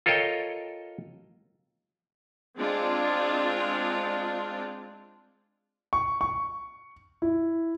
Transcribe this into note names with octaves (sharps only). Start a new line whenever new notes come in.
F4 A4 A#4 C#5 D#5 G5
G#3 C4 D4 F4
C#6
C#6
E4